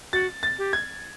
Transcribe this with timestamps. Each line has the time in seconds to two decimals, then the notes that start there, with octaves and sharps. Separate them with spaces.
0.13 F#4 A6
0.43 A6
0.59 G4
0.73 G#6